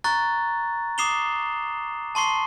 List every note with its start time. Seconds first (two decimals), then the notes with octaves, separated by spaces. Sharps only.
0.04 A#5 C#6 F#6 A6
0.98 D6 D#6 C7 E7 F7 G7
2.15 A5 C6 C#6 C7